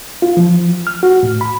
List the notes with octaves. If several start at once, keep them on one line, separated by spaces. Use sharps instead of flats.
F4
F3
F6
F#4
A2
B5